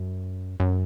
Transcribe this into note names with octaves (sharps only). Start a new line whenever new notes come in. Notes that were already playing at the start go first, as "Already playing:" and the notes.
Already playing: F#2
F#2